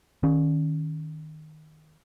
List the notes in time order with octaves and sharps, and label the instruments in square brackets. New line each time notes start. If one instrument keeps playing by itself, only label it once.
[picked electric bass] D#3 C#4